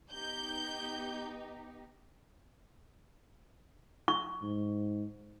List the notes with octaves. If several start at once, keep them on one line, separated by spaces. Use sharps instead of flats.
B3 D#4 G4 G6
C#6
G#2